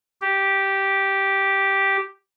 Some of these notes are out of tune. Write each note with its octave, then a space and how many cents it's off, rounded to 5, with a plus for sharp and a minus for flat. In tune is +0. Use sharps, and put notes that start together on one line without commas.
G4 -5